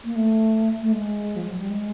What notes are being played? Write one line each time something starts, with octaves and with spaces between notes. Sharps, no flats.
A#3
A3
A3
G#3
F3
F#3
G3
G#3